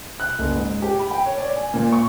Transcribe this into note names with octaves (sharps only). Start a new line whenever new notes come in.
F#6
F#1
G#2
G4
B5
G5
C#5
D5
G#5
A#2
C#6